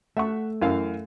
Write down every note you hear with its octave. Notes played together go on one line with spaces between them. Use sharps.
A3 E5 F#5 C#6
F#2 E3 F5